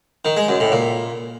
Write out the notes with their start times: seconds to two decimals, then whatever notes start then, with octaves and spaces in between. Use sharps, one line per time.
0.25 D#3
0.37 G#3
0.48 F#2
0.60 A2
0.72 A#2